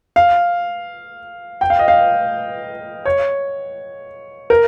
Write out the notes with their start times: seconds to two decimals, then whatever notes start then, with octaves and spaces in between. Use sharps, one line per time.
0.16 F5
1.61 G5
1.70 F5
1.79 D#5
1.88 F5
3.05 C#5
4.50 A#4